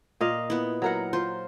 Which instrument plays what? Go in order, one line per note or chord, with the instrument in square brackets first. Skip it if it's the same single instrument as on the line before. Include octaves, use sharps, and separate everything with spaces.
[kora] A#2 D#5 F5
[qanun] B3 E4
[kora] F#3 A#4 F#5
[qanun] F4 C5